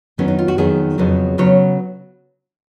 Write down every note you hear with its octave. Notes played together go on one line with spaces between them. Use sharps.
F2 D#3 F#3 B3 C#4
D#4
F4
F#4
F2 D#3 F#3 B3 G#4
F2 C#3 F#3 B3
C#3 F#3 B3 C#5